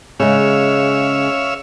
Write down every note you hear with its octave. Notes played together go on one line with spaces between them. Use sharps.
C#3 G#3 C#5 E5 F5